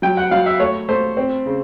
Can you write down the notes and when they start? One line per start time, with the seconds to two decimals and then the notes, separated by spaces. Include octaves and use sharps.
0.02 F#3 G5
0.17 F#5
0.31 F#3 F5
0.46 E5
0.60 A3 C#5
0.89 A3 C5
1.17 C4
1.46 C#3